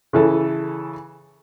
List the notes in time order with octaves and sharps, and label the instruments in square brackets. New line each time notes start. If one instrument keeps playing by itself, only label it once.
[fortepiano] C#3 E3 A4